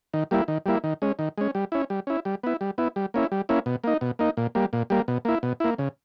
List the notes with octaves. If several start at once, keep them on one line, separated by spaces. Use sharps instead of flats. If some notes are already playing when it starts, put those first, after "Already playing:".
D#3
G3 A#3 E4
D#3
G3 A#3 E4
D#3
G#3 C#4
D#3
G#3 C#4
G3
C#4 E4
G3
C#4 E4
G3
B3 E4
G3
B3 E4
G3
A#3 C#4 E4
G3
A#3 C#4 E4
B2
A#3 D#4
B2
A#3 D#4
A#2
G3 A#3
A#2
G3 A#3
B2
A#3 E4
B2
A#3 E4
C#3